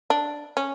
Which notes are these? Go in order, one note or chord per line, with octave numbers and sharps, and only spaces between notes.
D4
C#4